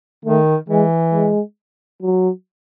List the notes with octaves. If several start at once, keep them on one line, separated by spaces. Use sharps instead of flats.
D#3 A3
E3 G#3
G#3
F#3